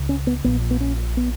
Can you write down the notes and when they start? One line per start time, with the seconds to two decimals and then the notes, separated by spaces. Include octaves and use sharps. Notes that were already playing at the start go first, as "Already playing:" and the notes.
Already playing: C#2 C#3
0.09 C#4
0.27 B3
0.44 A#1 A#2 B3
0.71 B3
0.80 C#4
1.17 B3